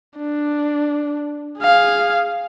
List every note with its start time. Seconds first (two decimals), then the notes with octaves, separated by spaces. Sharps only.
0.18 D4
1.60 G#4 F5